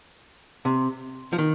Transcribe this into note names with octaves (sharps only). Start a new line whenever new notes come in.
C3
F3
D#3